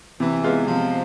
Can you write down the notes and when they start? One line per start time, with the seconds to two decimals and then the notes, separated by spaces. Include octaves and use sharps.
0.20 C3 E3
0.43 G#3 B3 F4
0.67 C3 F3